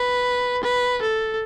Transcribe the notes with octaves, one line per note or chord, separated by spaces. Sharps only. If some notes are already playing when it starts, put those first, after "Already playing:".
Already playing: B4
B4
A4